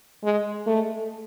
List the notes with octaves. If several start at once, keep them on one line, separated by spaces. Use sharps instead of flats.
G#3
A3